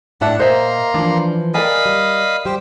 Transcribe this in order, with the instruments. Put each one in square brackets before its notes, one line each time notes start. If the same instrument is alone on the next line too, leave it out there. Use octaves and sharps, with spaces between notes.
[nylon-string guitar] A2 E4 E5 [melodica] D4 F#5 [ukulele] A5
[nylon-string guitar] A#2 E5 [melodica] A#3 A#5 C6 [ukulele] C5 D#5
[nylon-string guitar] E3 F3 [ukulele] D4
[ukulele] A#4 D5 G#5 [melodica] D#5 F5 B5
[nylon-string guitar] G3
[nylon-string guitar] G3 [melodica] G4 C5